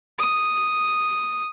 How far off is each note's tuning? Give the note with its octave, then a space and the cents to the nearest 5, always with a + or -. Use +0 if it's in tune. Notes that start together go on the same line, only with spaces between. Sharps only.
D#6 -5